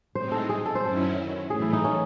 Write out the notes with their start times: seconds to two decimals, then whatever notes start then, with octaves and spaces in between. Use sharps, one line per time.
0.15 A2 G#3 C4 D#4 C5
0.32 A4
0.49 G#4
0.65 A4
0.75 C5
0.83 F#2 D#3 F#3 C#4 E4 A4
1.50 A2 E3 A3 G#4
1.62 E4
1.73 D#4
1.85 C#4